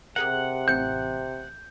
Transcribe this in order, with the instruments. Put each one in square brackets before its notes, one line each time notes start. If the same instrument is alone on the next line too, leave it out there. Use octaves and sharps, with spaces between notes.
[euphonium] C3 [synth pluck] G4 G#4 A#4 [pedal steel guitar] F#5
[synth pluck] A1 C4 C#7 [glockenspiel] G6